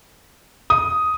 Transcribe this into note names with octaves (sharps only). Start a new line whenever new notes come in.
D#6